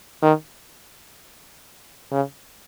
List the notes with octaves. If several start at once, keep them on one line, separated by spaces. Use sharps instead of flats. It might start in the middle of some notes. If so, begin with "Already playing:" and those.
D#3
C#3